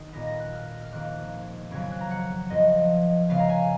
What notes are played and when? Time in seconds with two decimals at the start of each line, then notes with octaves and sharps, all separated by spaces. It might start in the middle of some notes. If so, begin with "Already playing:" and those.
Already playing: D#3 D#6
0.13 A#2 G#3 B3 A#6
0.27 A#6
0.40 F#6
0.53 F6
0.82 F6
0.92 F2 D#3 A#3 F#6
1.71 F2 C#3 F#3 B3 G#6
1.82 G#6
1.91 F#6
2.01 A#5
2.11 F#5
2.50 F2 F3 B3 D#5
3.29 C#3 G#3 B3 F5
3.40 A#5
3.49 G#5